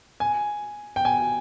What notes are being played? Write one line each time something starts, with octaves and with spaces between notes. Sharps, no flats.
G#5
G5
G#5